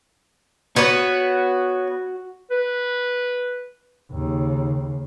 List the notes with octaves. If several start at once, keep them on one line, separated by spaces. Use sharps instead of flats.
B3 F#4 C#5
B4
D#2 C#3